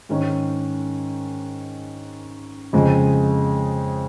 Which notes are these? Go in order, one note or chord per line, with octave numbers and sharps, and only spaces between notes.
G#2 D#3 C#4
F2 C#3 G#3